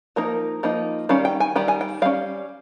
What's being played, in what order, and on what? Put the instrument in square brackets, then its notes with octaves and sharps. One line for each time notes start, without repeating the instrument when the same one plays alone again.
[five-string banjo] F3 A#3 D#4 A#4
F3 A#3 D#4
D#3 G3 C#4 F5
G5
G#5
D#3 G3 G5
G#5
G5
G3 C#4 F5